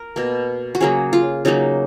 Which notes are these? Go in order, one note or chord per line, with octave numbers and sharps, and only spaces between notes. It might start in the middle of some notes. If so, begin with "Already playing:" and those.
Already playing: A#4
B2 A#3
F#4
C#3 F#3 A#3 G#4
F4
C#3 F#3 A#3 D#4